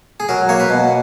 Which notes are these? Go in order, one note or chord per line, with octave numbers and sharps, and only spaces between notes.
G#4
F#3 A#4
A#3 C#5
B4
B2